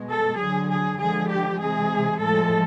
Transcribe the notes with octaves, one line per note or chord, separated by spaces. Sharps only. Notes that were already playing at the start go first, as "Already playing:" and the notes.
Already playing: B2 G#3
A4
D3 F#3 G#4
G#4
D3 F3 G#3 G#4
G4
C3 E3 G#3 G#4
A2 F3 G#3 A4